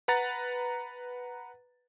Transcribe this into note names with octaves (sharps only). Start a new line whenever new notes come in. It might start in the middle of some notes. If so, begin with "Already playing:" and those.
B4 F#5 A#5 A6